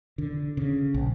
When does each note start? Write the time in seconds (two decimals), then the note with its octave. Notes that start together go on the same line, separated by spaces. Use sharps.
0.18 D3
0.57 C#3
0.94 A#1